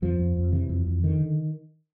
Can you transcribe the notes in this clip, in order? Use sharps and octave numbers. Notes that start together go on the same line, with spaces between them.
F2 F3
F2
F2
C3 E3
F2
F2
D3 D#3
D3